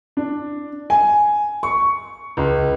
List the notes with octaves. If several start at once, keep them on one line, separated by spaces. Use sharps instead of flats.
D4
G#5
C#6
C#2